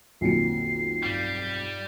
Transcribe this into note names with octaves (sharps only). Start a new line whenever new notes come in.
B1 F2 D#3 A#3 F4 C7 C#7
G2 G3 F5 G6